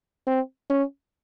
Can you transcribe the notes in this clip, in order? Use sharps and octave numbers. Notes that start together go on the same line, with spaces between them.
C4
C#4